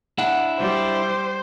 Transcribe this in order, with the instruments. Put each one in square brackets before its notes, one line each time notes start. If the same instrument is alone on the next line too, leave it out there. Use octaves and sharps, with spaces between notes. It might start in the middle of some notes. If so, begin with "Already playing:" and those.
[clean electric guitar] D4 E4 [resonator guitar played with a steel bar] F#5
[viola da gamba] G3 [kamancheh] C5